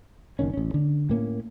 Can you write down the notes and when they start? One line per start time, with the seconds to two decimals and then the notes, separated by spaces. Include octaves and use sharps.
0.39 F#1 B1 D#3 C#4
0.54 A1 C#4
0.74 D3
1.09 A2 A#3 C#4